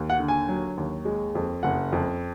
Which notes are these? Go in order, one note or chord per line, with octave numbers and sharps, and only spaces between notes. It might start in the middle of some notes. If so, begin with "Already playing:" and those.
Already playing: D#2
F#5
D3
G#5
F#3
D#2
G#3
F2
F#1 F#5
F2